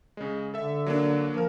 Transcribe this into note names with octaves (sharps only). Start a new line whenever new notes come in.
C#3 G#3
D3 A4 E5
F#3 A#3 D4
F3 A#3 A#4